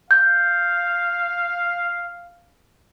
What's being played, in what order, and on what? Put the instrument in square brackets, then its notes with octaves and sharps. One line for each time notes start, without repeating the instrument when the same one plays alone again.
[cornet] F5 [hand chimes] G6